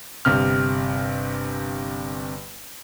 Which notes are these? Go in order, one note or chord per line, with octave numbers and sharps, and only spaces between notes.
G1 C3 F6